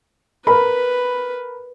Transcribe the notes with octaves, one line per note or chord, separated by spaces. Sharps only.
A#4 B4 B5